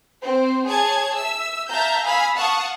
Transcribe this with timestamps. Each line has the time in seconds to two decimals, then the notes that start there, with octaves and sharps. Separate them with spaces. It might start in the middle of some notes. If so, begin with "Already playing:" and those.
0.24 C4 C5
0.66 G#4 C#5 A5 G#6
1.17 E5 E6
1.69 E5 F5 A5 A#5 G6
2.05 F5 G#5 B5 D#6 E6
2.36 F5 F#5 A5 C#6 D#6